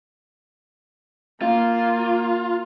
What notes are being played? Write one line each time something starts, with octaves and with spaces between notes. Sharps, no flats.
A#3 F4